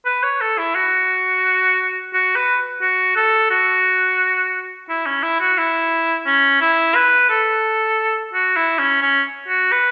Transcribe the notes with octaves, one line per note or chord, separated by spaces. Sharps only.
B4
C#5
A4
E4
F#4
F#4
B4
F#4
A4
F#4
E4
C#4
E4
F#4
E4
C#4
E4
B4
A4
F#4
E4
C#4
C#4
F#4
B4